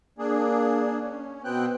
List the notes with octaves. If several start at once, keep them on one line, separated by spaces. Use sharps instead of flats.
A#3 D4 G#4
C#4
B2 B3 C4 G5 F#6